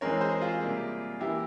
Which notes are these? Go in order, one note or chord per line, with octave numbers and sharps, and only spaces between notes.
E3 G#3 C4 A#4 C#5
G#4 C5
F4 G#4
C3 G3 A#3
E3 A#3 E4 G4